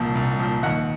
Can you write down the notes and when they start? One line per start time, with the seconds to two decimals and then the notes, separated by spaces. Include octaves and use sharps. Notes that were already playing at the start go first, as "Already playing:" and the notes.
Already playing: C2 A#2 F3
0.15 C2
0.40 A#2 F3
0.63 D#2 F#5